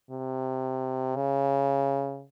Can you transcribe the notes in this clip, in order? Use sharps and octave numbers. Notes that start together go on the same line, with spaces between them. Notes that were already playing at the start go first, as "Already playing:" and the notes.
C3
C#3